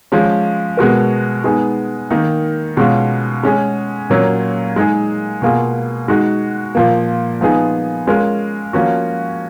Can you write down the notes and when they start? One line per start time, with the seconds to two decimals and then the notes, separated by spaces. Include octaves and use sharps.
0.12 F3 G#3 C#4
0.77 B2 G#3 B3 F#4 A#4
1.44 G#3 B3 D#4 G#4
2.10 D#3 A#3 D#4
2.77 B2 G#3 C#4 F4
3.43 G#3 C#4 G#4
4.10 A#2 F#3 A#3 C#4
4.76 G#3 D#4 G#4
5.42 B2 A#3 F4 G#4
6.08 G#3 D#4 F#4
6.75 A#2 F3 A#3
7.41 F3 B3 D#4 G#4
8.07 G#3 C#4 F4 A#4
8.73 F3 A#3 C#4 F#4